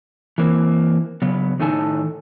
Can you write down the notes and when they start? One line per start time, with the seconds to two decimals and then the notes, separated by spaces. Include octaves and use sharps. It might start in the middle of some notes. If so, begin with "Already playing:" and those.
0.38 E3 A#3 C4
1.22 C#3 F#3 B3
1.60 A2 D#3 D#4 A4 G#5 A5